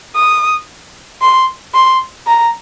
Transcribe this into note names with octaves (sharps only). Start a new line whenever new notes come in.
D#6
C6
C6
A#5